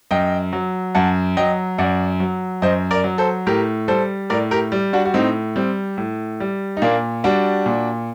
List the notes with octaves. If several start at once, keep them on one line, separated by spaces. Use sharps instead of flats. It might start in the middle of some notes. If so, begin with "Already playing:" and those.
F#2 D#5 G5
F#3
F#2 F#5 A5
F#3 D#5 G5
F#2 D5 F#5
F#3
F#2 C5 D#5
A#4 D5
F#3
A4 C5
A2 G4 A#4
G3 A4 C5
A2 A#4 D5
G4 A#4
G3
D4 F#4
F#4
A2 C4 D#4
G3 C4
A2
G3
D#4
A#2 A#3 D4
G3 D4 F#4
A#2